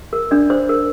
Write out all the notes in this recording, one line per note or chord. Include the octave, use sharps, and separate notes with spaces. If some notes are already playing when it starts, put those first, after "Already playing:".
A#4
D4 D5
C5
A#4